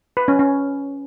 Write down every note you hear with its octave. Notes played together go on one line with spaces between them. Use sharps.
B4
C#4
C#4